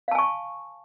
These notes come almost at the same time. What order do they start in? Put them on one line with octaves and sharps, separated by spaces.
F5 A5 G#5 C#6